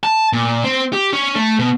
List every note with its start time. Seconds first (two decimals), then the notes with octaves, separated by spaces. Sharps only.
0.03 A5
0.33 A#2
0.64 C4
0.93 G4
1.13 C#4
1.35 A3
1.59 B2